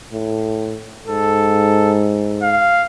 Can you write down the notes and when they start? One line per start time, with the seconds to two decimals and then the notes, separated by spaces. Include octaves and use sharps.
0.13 A2
1.07 G#2 A4
2.43 F5